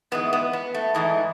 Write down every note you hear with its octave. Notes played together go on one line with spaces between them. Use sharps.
G#2 E3 G#3 B3
B3
B3
A3
G#2 E3 G#3 A3